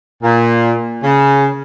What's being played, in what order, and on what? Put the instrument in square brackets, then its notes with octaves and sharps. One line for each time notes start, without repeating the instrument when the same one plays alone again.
[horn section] A#2
C#3